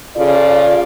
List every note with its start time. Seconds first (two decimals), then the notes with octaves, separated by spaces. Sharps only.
0.16 C#3 F4 A4 D5